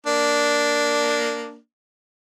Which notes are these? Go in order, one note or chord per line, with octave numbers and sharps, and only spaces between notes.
A#3 D4